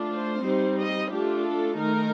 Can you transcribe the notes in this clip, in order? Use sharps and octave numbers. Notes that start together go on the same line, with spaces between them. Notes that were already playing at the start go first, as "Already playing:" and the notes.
Already playing: A3 D4 F4
C5
G3 C4 D#4
D#5
A3 D4 F4 G4
A4
D#3 A3 D#4 A#4